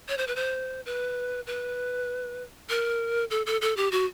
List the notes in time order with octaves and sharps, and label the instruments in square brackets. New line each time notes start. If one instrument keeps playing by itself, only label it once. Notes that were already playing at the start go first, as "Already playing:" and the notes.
[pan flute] C#5
C5
B4
C5
B4
B4
A#4
A4
A4
A4
G4
F#4